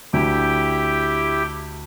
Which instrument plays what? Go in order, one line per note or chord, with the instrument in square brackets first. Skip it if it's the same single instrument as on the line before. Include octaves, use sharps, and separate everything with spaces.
[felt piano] D2 [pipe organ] E4 G4 G5